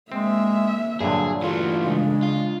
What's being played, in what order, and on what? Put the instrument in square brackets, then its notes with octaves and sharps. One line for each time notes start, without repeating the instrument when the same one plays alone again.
[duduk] G#3 [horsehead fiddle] A#3 E5 [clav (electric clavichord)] C4
[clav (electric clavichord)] G2 A#2 D3 [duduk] F#3 [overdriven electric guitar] G#4
[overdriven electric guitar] E3 A3 [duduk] F4 [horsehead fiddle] F#4
[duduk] C#3 [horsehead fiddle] G#3 D4
[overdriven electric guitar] F4